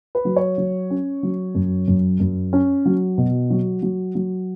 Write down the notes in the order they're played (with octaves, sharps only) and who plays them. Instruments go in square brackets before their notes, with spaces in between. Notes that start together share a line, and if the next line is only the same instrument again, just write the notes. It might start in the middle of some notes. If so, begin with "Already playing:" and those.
[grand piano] B4
F#3
C#5
F#3
C#4
F#3
F#2
F#2
F#2
C#4
F#3
B2
F#3
F#3
F#3